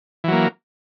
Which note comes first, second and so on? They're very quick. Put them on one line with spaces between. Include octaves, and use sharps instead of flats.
E3 F#3 A#3